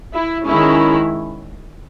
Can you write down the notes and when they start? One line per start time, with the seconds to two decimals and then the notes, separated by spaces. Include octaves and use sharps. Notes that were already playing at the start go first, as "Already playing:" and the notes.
0.13 E4
0.46 D#3 G#3 C#4 E4